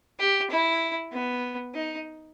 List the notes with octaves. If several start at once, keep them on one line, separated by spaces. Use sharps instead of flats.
G4
E4
B3
D#4